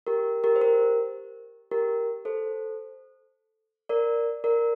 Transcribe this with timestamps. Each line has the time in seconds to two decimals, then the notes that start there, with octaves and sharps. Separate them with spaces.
0.07 G4 A#4
0.44 G4 A#4
0.56 C5
0.61 G4 A#4
1.71 G4 A#4
2.25 A4 C5
3.89 A#4 D5
4.44 A#4 D5